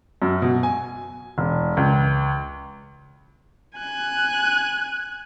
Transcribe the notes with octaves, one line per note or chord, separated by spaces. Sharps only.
F#2
B2
G#5
E1
C#2
G#5 F#6